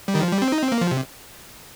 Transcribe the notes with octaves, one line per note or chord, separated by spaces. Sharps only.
G3
D#3
F3
G3
C4
D#4
C4
A#3
F3
C3